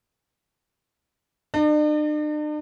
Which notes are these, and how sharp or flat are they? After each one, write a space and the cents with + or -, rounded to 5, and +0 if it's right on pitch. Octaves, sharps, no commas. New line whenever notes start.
D4 +45 D5 +40